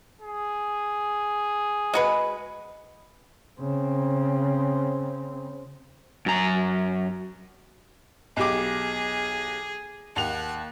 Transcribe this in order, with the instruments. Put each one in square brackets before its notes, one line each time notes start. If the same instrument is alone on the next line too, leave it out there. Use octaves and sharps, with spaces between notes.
[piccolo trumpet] G#4
[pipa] G#3 F#4 B4
[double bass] C#3 C4
[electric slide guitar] F#2 A#5
[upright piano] B1 G4 D6 [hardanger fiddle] G#4
[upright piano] D#2 F7 [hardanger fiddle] F#5